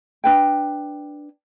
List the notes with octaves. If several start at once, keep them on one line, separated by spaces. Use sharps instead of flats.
D4 B4 G5